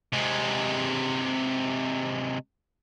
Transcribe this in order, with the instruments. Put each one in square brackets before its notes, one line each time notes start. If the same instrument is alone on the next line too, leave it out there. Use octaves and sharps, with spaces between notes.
[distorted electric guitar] C3 G#3